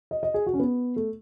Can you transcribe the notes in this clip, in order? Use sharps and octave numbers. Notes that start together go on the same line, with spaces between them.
D#5
D#5
G#4
F#4
C#4
B3
A3